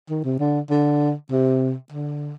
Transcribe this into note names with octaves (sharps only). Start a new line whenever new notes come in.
D#3
C3
D3
D3
C3
D3